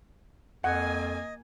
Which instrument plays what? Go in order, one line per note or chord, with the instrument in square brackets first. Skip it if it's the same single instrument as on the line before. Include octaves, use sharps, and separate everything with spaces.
[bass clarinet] F2 [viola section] A#3 G#5 [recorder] D#5 [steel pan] F#5